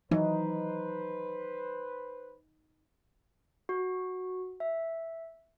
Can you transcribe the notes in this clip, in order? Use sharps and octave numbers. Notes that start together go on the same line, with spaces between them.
E3 F#3 D#4 B4 C5
F#4
E5